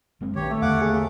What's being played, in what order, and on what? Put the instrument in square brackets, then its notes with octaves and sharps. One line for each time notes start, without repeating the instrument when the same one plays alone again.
[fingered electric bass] F#1 G#3 C4
[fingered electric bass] A#1 D#3 [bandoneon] G2 G4 C#5
[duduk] A3
[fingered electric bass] E2 D3 [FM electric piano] F5 [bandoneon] F#5 D6
[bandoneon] D#2 [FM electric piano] G#4